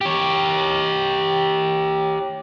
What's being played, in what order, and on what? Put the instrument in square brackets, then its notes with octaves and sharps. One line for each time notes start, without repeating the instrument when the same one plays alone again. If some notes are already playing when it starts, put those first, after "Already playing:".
[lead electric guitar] G4 C#5